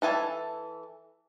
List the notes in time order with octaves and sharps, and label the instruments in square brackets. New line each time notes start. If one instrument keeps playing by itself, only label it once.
[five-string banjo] E3 A4 G#5 A5